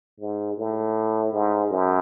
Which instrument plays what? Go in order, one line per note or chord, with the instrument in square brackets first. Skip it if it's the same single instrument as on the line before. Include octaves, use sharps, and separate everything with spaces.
[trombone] G#2
A2
G#2
F#2